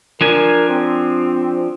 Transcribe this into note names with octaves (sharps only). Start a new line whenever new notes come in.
F3 D4 A#4 G#5
C4